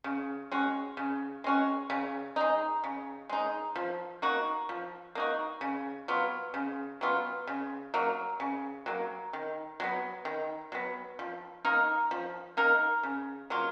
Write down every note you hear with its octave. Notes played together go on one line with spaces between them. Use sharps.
C#3
G#3 C#4 F#4
C#3
G#3 C#4 F#4
C#3
G#3 D#4
C#3
G#3 D#4
F3
A#3 D#4 F#4
F3
A#3 D#4 F#4
C#3
F#3 B3 F4
C#3
F#3 B3 F4
C#3
F#3 A#3
C#3
F#3 A#3
D#3
F#3 B3
D#3
F#3 B3
F3
A#3 D#4 A#4
F3
A#3 D#4 A#4
C#3
F#3 A#3 F4